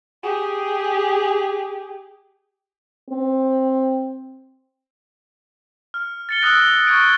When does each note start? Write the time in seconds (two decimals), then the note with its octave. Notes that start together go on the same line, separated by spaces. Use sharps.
0.23 G4 G#4
3.10 C4
5.94 F6
6.29 A6 C#7 G7
6.42 D#6 E6 F#6 A#6 D7
6.58 G7
6.87 C#6 F6 G#6 D7